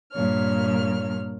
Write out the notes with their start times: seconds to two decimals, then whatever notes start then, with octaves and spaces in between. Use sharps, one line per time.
0.13 G2 A#2 A#3 C#5 F6